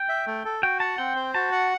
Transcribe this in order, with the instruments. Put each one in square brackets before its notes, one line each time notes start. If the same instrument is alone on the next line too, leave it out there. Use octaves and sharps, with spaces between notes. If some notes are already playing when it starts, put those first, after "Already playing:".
Already playing: [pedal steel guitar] G5
[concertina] E5
A3
A4
[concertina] F#4 [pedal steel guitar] G5
[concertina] F#5 [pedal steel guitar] A5
[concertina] C4 [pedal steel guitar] G5
[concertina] C5
[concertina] F#4 [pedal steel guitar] A5
[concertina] F#5